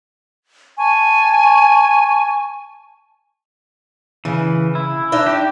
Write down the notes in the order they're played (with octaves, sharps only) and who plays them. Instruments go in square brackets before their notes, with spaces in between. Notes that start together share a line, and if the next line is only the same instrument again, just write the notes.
[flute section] G#5 A5 C#6
[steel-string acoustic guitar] C#3 [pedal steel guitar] E3
[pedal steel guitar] E4
[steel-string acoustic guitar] D4 D#4 E5
[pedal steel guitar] G4